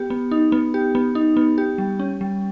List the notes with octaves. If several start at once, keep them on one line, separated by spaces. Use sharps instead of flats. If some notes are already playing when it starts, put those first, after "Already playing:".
Already playing: B3 G4
B3
D#4
B3
G4
B3
D#4
B3
G4
G3
C#4
G3